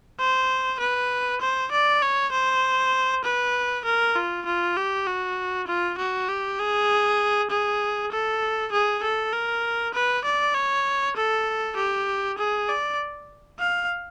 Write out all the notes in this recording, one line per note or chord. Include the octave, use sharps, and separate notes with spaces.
C5
B4
C5
D5
C#5
C5
B4
A#4
F4
F4
G4
F#4
F4
F#4
G4
G#4
G#4
A4
G#4
A4
A#4
B4
D5
C#5
A4
G4
G#4
D5
F5